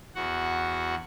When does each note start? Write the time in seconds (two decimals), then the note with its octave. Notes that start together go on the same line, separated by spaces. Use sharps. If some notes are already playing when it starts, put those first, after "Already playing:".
0.15 E2 F#4 F#5